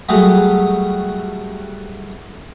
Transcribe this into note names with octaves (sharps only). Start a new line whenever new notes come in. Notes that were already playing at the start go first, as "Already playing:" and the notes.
F#3 G3 A3 F#4 G#4